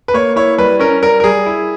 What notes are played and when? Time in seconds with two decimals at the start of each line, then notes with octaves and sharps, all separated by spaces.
0.08 B4
0.14 A#3 C#5
0.36 E4 C#5
0.58 G3 B4
0.79 C#4 A#4
1.02 G3 A#4
1.20 A#4
1.24 G3 G#4
1.46 E4